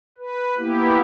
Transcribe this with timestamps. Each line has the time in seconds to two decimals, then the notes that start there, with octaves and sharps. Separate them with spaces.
0.18 B4
0.58 A#3 B3 E4 G4